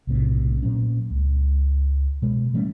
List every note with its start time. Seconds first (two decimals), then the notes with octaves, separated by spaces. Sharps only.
0.07 B1 A2 C3
0.62 A#2 F#3 C#4
1.11 C#2
2.22 B2 G#3
2.54 E3 G3 A3 C#4